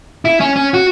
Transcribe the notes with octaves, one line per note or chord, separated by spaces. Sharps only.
E4
C#4
C#4
F#4